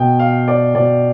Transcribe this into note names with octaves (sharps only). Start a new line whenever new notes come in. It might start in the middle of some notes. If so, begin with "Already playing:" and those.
Already playing: B2 G5
F5
D5
B2 D5